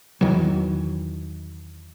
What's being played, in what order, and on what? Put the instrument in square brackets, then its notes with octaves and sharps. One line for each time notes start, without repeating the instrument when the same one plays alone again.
[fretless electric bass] E2 D#3 E3 F#3